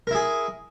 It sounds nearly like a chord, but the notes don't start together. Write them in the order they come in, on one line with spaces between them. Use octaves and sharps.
A#4 E4 G#4